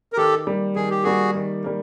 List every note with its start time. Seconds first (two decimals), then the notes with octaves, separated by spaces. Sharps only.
0.13 A#4
0.17 D#3 G4 A4
0.47 G3 A#3
0.76 D#3 G#4
0.90 G4
1.04 G3 A#3 F#4 G#4
1.35 D#3
1.64 G3 A#3